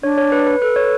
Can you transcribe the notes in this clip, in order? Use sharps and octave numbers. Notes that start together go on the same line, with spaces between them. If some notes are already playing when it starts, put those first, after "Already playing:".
D4 C#5
C#5
B4
B4
A4 B4
C#5